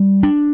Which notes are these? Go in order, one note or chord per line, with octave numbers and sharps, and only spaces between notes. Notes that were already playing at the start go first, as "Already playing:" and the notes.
Already playing: G3
D4